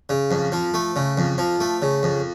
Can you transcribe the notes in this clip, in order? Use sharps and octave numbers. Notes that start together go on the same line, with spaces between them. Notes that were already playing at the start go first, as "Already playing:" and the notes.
C#3
F2
F3
A3
C#3
F2
F3
A3
C#3
F2